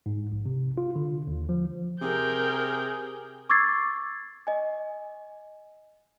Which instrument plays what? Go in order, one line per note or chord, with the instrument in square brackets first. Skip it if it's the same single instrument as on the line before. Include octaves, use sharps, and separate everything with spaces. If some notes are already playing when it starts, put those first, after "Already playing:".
[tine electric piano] G#2
A#1
C3
F4
D3
D#2
F3
[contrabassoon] C3 [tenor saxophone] G#4 [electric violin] A#4 G5
[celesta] C#6 D6 E6 G#6 A6 C7
D#5 G#5